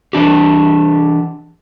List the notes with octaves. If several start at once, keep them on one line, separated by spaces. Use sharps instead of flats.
E3 D4 G4